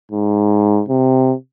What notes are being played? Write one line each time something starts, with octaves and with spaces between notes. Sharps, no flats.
G#2
C3